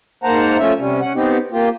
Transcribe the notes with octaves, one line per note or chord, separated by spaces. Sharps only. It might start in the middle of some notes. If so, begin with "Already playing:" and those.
G#2 A#3 C5 F#5 A5 A#5
F3 A3 C#4 F4 E5
C3 G3 C#4
C#4 F#5
B3 C4 D#4 G4
A#3 F4 G4